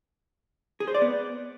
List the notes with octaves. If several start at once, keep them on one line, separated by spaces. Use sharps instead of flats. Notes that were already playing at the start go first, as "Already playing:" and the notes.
G#4
C5
D5
B3